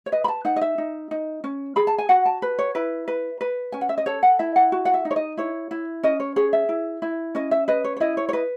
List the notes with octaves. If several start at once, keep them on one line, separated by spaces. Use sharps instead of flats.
C#5
B4 D#5
B5
A5
D#4 F#5
D#5
E5
D#4
D#4
C#4
G#4 B5
A5
G#5
F#4 F#5
A5
B4
C#5
E4 B4
B4
B4
C#4 G#5
F#5
E5
D#5
A4 C#5
F#5
E4 E5
F#5
F#4
F#5
E5
D#4
C#5
D#5
E4 C#5
E4
C#4 D#5
C#5
G#4 C#5
E5
E4
E4
C#4 D#5
E5
B4 D#5
C#5
C#5
E4 D#5
C#5
C#5
B4 D#5